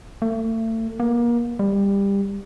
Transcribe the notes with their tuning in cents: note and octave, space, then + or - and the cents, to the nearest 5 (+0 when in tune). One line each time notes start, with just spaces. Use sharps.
A3 +35
A#3 +30
G3 +20